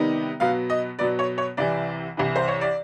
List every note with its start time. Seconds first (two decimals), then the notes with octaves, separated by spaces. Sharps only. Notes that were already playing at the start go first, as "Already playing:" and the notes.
Already playing: C3 D#3 G3 B3 D#4
0.40 B2 F#3 B3 F5
0.70 D#5
0.99 B2 F#3 B3 D5
1.19 C#5
1.38 C#5
1.57 C2 C3 E3 D5
2.17 C2 C3 E3
2.36 C5
2.48 C#5
2.61 D5